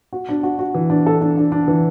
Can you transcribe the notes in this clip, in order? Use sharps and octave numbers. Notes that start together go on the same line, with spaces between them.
F#4
D4
F#4
F#4
E3
D4
A4
D4
D4
D4
E3